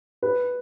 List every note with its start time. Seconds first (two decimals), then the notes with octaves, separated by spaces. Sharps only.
0.23 B4